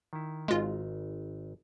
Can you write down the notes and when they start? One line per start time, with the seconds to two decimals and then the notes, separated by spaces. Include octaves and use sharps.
0.13 D#3 E4
0.48 G#1 G#3 F4 A#5